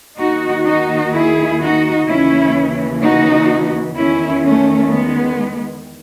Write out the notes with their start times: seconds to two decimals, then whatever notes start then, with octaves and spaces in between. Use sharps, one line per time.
0.19 D#2 D#3 D#4 F#4
0.66 D#4 F#4
1.13 E4 G#4
1.61 D#4 F#4
2.08 D#2 C#3 E3 C#4 E4
3.03 D#4 F#4
3.96 E2 D#3 C#4 E4
4.44 A3 C#4
4.91 G#3 B3